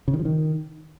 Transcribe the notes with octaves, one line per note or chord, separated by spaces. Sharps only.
C#3
D#3
F3
D#3